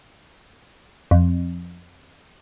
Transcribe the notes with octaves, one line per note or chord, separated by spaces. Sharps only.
F2